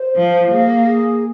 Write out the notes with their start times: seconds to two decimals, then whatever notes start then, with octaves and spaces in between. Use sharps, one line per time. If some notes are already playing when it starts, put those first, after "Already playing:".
Already playing: C5
0.16 F3 F5
0.51 A#3 G#4
0.85 G#4